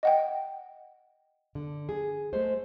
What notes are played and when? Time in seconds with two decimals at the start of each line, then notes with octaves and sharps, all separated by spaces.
0.03 D#5 F#5 G5
1.55 D3
1.89 G#4
2.33 G#3 A3 C5